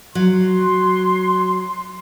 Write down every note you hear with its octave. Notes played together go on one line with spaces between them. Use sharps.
F#3 C6